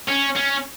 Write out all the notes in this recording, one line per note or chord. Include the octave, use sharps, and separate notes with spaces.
C#4
C#4